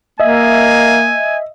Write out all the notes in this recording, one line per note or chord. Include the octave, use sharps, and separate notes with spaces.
A#3 D#5 E5 G#5